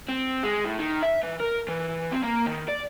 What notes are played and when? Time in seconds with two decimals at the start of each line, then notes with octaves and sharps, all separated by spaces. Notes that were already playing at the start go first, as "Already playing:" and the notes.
0.08 C4
0.43 G#3
0.65 A2
0.79 D#3
1.02 E5
1.23 E3
1.40 A#4
1.68 E3
2.12 C4
2.24 A#3
2.46 D#3
2.68 D5